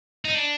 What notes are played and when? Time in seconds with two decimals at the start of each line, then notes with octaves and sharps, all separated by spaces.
0.25 D#4
0.35 D4